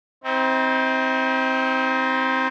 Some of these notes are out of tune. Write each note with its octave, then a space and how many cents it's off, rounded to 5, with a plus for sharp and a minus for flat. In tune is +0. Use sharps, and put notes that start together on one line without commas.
C4 +0 D#4 +45